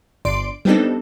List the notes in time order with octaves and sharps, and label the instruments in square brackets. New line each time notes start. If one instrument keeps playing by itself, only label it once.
[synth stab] G1 D5 C6 D7
G3 B3 C4 D4 D#4 A4